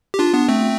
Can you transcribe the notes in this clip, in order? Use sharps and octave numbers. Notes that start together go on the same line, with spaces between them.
G4
D4 F4
B3 D4
A3 C4